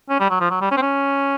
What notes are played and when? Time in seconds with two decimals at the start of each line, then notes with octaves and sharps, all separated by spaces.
0.10 C#4
0.20 G3
0.30 F#3
0.40 F3
0.51 F#3
0.61 G3
0.72 C#4
0.77 C4
0.82 C#4